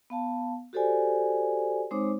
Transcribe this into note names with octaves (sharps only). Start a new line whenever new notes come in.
B3 F5 A5
F#4 G4 A4 C5 D5 G#5
G#3 C4 D#4 C5 C#5 D6